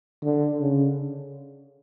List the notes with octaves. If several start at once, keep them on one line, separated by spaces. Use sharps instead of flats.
D3
C#3